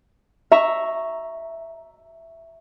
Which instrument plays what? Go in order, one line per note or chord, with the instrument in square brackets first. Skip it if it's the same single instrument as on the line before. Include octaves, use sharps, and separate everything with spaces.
[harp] E5 A#5 C#6